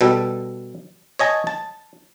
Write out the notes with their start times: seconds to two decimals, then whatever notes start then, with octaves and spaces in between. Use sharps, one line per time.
0.01 B2 G3 A4
1.19 C#5 D#5 G#5 A5
1.47 A5